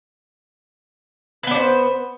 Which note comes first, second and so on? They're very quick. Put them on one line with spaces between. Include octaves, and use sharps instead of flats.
B4 B3 D4 C5